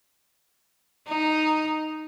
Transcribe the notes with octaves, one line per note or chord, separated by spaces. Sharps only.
D#4